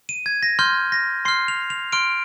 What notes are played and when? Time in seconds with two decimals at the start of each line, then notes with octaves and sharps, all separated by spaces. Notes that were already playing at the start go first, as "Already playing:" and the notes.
0.09 D#7
0.26 G#6
0.43 A#6
0.59 C6 F6 G6
0.92 A#6
1.25 C6 F6 C7
1.48 F7
1.70 F7
1.92 C6 F6 D7